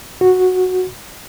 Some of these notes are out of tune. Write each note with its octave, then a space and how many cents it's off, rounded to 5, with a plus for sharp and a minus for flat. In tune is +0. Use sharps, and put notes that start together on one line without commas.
F#4 -10